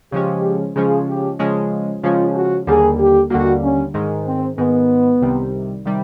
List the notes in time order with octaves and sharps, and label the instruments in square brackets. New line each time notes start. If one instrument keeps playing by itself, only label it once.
[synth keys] C#3 F3 G#3 C#4 [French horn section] G4
[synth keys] C#3 F3 G#3 C#4 [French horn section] G#4
[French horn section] G4
[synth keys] C#3 F3 G#3 C#4
[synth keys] C#3 F3 G#3 C#4 [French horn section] F4
[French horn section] F#4
[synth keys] D#2 D3 G3 A#3 [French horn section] G#4
[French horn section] G4
[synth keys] D#2 D3 G3 A#3 [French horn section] F#4
[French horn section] C#4
[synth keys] G#2 D#3 G#3
[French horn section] C4
[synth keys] G#2 D#3 G#3 [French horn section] B3
[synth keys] C2 C3 D#3 G3
C3 D#3 G3